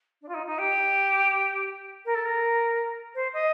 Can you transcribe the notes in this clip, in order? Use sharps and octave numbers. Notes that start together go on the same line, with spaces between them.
D4
F4
D#4
D#4
G4
A#4
A4
A#4
C5
D#5